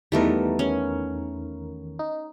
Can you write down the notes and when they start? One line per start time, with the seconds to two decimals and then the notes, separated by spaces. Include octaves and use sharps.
0.12 E2 D#3 G3 A3 B3 A#4
0.59 C#4
1.99 D#4